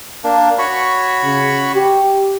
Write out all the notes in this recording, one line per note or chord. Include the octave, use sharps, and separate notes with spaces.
A#3 D4
F#4 C#5 B5
C#3
G4